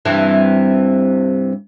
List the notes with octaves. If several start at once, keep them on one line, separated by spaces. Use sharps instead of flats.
G2 C3 E3